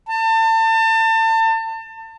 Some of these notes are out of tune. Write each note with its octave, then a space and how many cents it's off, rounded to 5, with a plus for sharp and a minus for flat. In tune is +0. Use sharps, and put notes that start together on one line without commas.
A5 +35